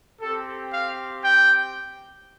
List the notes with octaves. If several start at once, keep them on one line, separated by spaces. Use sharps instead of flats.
C4 G4 A4
F5
G5